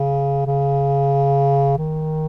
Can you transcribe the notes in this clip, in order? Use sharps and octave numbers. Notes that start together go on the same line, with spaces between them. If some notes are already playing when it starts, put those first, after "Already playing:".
Already playing: C#3
C#3
D#3